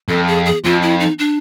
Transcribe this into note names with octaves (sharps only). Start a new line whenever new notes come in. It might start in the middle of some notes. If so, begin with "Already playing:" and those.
F2 A4
G#4
G#4
F2 F4
E4
D#4
D4